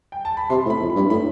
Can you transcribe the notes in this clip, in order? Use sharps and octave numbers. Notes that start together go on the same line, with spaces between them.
G5
A5
B5
C3 C6
A2
B5
F2
B5
G2
A2 B5